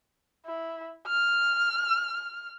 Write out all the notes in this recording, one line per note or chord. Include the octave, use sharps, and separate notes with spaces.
E4
F6